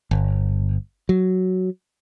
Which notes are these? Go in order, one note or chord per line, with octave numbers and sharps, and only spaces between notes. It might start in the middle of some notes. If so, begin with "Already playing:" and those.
G1
F#3